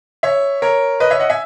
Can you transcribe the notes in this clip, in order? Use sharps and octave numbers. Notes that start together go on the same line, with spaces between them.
C#5 E5
A#4 C#5
B4 D#5
C#5 E5
D#5 F#5
E5 G#5